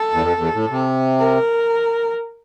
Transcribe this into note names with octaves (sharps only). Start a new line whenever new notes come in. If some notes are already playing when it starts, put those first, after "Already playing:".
Already playing: A4
E2
F2
E2
A2
C3
A#4